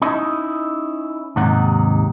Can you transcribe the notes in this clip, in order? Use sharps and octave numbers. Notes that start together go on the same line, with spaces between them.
C#4 D#4 E4 D#5
D#2 G#2 C3 D#4 F#5